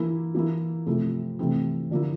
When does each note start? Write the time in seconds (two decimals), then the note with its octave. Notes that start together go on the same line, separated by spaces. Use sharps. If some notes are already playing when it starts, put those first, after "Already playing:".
Already playing: E3 A#3 E4
0.35 E3 A#3 E4
0.86 C3 F3 A3 E4
1.39 C3 E3 A3 C4 E4
1.91 D3 F3 A#3 E4